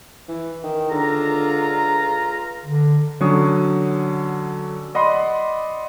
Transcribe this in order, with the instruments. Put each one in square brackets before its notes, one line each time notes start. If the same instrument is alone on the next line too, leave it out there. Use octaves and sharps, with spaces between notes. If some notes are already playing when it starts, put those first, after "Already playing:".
[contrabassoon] E3
D#3
[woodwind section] C#2 F4 A#5 [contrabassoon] D3
[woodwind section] D3
[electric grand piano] D3 F#3 C#4 F#4 C#6 D#6
D5 D#5 F#5 B5 C6 D#6